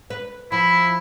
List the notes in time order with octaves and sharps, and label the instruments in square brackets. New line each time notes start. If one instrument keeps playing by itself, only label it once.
[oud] B4
[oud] F3 [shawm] E4 [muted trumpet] B5